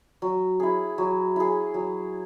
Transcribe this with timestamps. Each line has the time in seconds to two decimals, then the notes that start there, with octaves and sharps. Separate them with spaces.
0.22 F#3
0.60 E4 G#4
0.98 F#3
1.36 E4 G#4
1.74 F#3